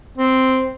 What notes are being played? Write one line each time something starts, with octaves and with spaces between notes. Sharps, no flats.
C4